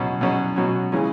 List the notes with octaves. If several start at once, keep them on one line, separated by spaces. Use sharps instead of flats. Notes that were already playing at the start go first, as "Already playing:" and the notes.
Already playing: B2 F#3 C#4
B2 F#3 C#4
B2 F#3 C#4
C#3 E3 G#3 C#4